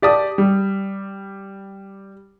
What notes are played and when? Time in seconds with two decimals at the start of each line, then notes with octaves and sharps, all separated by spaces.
0.02 G4 D5 A5 D#6
0.38 G3